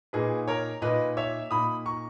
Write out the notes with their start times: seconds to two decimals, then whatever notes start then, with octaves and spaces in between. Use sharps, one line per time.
0.13 A#2 A#3 D#4 G#4 B4
0.48 A#4 C#5
0.82 A#2 A#3 D#4 B4 D#5
1.17 C#5 E5
1.51 A#2 A#3 D#4 B5 D#6
1.86 A#5 C#6